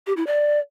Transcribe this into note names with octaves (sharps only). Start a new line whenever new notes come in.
G4
E4
D5